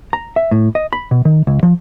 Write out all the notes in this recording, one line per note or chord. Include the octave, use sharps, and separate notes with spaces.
A#5
E5
A2
D#5
B5
B2
D#3
C#2
F3